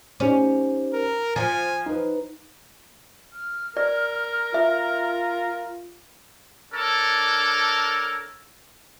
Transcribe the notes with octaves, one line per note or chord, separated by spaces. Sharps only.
C#4 D#4 G4 C5
A#4
F3 G#5 A6
D#4 B4
F6
A#4 D5
F4 E5
D4 A4 A#4 C#5